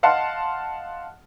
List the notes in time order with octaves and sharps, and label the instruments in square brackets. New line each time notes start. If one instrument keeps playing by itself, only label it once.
[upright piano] D#5 F5 F#5 A5 C6